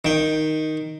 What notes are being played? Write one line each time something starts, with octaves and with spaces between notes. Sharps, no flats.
D#3 G5